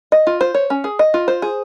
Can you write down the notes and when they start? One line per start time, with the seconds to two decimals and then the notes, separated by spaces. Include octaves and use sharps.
0.12 D#5
0.27 F4
0.41 C5
0.55 C#5
0.70 C#4
0.84 G#4
0.99 D#5
1.14 F4
1.28 C5
1.42 G#4